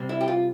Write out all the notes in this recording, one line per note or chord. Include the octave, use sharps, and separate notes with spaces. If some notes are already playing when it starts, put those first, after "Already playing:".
Already playing: C3 G3 C4
E4
G4
F4